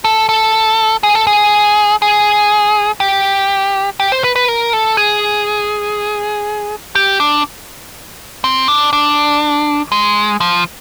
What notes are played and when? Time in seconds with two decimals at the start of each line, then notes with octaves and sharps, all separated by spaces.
0.05 A4
0.29 A4
1.03 G#4
1.15 A4
1.27 G#4
2.02 G#4
3.00 G4
4.00 G4
4.12 C5
4.24 B4
4.36 B4
4.48 A#4
4.73 A4
4.97 G#4
6.95 G4
7.20 D4
8.44 C4
8.68 D4
8.93 D4
9.92 G#3
10.41 F3